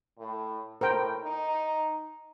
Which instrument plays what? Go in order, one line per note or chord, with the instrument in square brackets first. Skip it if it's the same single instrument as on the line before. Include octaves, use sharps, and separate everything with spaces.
[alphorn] A2
[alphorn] A2 [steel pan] A#4 C5 G5
[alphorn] D#4